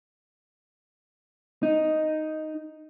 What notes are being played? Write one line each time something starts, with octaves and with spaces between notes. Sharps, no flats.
D#4